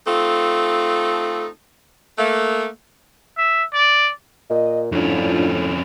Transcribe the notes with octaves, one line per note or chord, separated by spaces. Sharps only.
A3 C4 D#4 F4 A4
A3 A#3
E5
D5
A#2 D#5
F2 A2 C#4 D4 E4 F4